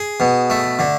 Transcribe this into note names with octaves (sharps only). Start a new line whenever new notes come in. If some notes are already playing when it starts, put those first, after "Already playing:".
Already playing: G#4
B2
A3
D3